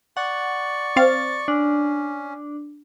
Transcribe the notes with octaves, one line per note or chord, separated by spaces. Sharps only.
D5 F#5 C#6
C4 F5 A6
C#4 D4